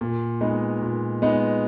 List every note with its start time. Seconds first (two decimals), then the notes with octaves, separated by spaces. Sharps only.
0.01 A#2
0.41 G#3 B3 D#4
0.81 A#2
1.22 G#3 B3 D#4